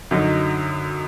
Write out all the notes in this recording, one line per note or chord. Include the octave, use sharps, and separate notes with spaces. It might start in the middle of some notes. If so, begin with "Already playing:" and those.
F#2 D3 F#3 D#4 D#5